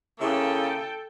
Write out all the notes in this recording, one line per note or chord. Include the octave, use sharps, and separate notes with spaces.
C#3 A#3 E4 A4 G5